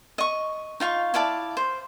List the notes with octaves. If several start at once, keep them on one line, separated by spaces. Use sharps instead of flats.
D#5 C#6
D#4 F4 F5 C#6
E4 D5 F5 A5
C5